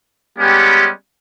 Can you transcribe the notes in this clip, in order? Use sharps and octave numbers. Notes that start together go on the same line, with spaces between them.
G3 G#3 B3 C#4 G4